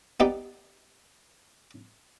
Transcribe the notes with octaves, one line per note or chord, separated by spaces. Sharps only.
B3 D#4 G4 D5